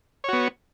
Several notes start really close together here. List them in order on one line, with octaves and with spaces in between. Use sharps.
C#5 F#4 B3